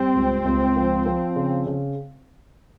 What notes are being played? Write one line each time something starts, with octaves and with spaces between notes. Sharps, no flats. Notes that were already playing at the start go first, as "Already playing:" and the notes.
Already playing: G3 C4
C#2
C#2
F3
F3
C#3
C#3